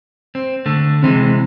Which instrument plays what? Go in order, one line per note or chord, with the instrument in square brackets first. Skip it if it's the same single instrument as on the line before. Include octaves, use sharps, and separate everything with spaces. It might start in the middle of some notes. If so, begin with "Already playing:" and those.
[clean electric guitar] C4
D3 A3
[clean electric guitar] C3 E3 G#3 [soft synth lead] C4